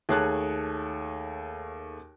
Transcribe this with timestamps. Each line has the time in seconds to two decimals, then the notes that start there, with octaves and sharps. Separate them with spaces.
0.09 D#2 A3 G#4 C#5 A5 F#6